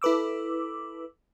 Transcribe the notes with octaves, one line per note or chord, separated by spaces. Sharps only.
E4 A4 B4 D6 E6